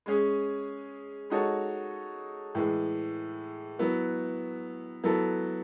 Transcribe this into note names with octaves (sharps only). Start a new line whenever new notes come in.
G#3 C#4 G#4
G#3 D#4 F#4 A4 C#5
A2 E3 G#3
F#3 B3 E4
F#3 B3 E4 A4